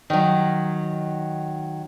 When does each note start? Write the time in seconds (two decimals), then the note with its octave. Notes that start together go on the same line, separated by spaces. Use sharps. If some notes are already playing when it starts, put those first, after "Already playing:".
0.10 D#3 F#3